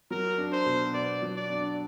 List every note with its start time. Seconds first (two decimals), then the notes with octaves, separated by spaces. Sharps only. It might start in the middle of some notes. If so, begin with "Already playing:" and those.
0.11 F#3 A#4
0.38 D4
0.52 C5
0.66 B2
0.94 B3 D5
1.22 F#3
1.36 D5
1.50 D4